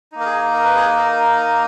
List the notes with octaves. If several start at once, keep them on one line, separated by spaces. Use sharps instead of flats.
A#3 D#4
A#4
G#4
A#4
B4
G#4
A#4